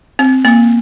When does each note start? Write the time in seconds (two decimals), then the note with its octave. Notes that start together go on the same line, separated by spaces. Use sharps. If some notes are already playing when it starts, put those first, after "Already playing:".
0.19 C4
0.45 A#3